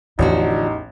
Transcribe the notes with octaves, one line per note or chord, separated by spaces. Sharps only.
A1 E2 D3 F3 D#4 F#4